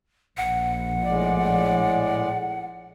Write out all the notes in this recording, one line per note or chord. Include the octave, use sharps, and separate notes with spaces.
A#1 F#5
A2 G#3 D5